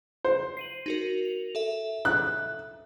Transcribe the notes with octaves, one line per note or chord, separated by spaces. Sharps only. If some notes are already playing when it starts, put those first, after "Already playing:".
C5
C7 D#7 F#7
D#4 F#4 A#4
F7
A4 E5
F#6